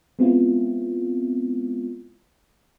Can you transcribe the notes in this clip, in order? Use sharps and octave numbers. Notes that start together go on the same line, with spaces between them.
G#3 B3 C4 E4 F4